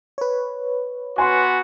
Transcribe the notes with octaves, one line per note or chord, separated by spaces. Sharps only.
B4 C#5
B3 F#4 G#5 C6